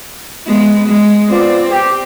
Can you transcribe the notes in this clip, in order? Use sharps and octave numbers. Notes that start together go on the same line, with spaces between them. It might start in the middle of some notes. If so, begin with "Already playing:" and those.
G#3 B3
G#3
B3 C4 F4 D5
G4